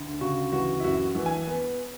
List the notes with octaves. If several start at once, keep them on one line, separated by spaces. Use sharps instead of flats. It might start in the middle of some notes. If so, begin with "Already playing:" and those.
Already playing: D2
C#3 F#4
E3 F#4
E4
F#2 F#4
E3
G#5
B3